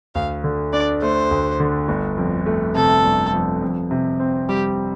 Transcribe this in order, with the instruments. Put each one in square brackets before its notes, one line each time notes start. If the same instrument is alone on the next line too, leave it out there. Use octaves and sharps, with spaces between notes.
[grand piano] D2 [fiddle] F5
[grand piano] D3
[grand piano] D4 [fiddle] D5
[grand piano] A3 [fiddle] C5
[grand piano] D2
D3
G1
F2
A3
[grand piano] C3 [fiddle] A4
[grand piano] G1
F2
F2
C3
C4
[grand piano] G3 [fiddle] G4